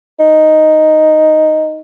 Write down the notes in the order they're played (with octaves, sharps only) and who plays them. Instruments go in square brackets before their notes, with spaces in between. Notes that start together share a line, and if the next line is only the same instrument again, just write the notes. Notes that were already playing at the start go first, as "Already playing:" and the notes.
[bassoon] D#4